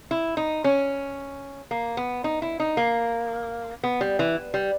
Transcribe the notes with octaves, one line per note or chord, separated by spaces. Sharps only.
E4
D#4
C#4
A#3
B3
D#4
E4
D#4
A#3
B3
G3
E3
G3